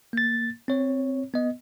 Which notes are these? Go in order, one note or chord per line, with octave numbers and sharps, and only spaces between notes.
A#3 A6
C4 C#5
B3 D#5